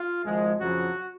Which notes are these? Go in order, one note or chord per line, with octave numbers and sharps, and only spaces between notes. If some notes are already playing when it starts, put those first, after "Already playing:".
Already playing: F4
G#1 G#2 F3 G#3
F2 C#3 F3 F#3 F#4